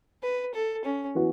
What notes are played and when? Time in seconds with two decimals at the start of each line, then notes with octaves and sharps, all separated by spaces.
0.23 B4
0.54 A4
0.85 C#4
1.15 E3 B3 F#4